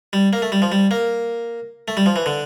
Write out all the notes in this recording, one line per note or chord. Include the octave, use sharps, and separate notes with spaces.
G3
A#3
A3
G3
F3
G3
A#3
A3
G3
F3
E3
D3